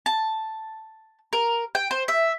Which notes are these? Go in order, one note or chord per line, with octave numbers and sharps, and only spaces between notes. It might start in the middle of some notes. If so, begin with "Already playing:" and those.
A5
A#4
G5
C5
E5